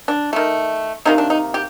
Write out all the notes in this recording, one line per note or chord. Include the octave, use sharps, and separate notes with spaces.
D4
D#3 A3
C3 D#3 A#3 D#4
D4
D#4
G4